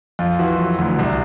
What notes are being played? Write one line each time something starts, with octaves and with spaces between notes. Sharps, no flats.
F2 F4
E3 F#4
F#3
D2
C2